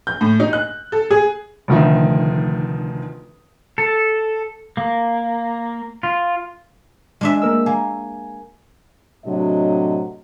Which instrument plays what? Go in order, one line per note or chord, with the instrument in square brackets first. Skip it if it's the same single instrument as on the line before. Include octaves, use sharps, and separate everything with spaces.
[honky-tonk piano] G6
A2
D#4
F#6
A4
G#4
[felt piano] F1 D2 D#3 F3 D#4 E5
[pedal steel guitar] A4
A#3
F4
[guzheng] G#3 D4 E5
[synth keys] A#3 A#4 E6
[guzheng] A#3 [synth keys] G#5
[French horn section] A2 C3 F#3 D4 D#5